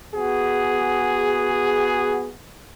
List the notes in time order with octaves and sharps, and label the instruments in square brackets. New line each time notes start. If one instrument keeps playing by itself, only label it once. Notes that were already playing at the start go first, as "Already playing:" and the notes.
[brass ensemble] B3 F#4 G#4